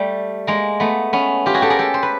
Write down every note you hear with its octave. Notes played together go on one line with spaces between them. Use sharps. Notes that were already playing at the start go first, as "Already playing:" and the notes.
Already playing: G3 A3
G#3 A#3
A3 B3
B3 C#4
F4 G4
F#4 G#4
G4 A4
G#4 A#4
G4 A4
C5
B4